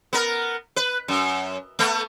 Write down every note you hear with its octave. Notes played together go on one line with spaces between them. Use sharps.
B3 A#4
B4
F#2
A3 B3